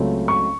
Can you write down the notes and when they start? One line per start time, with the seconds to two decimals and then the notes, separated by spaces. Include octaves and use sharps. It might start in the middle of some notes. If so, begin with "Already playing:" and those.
Already playing: C#2 C#3 F#3 A3 C4
0.28 C#6